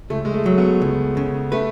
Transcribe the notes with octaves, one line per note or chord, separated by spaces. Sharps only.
C#2 A3
G#3
A3
F#3
B3
C#2
C#3
A3 B4